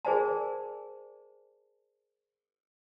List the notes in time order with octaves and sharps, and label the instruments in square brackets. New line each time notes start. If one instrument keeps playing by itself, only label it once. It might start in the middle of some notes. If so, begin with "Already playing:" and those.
[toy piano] G#4 A#4 C5 D5 G#5 A5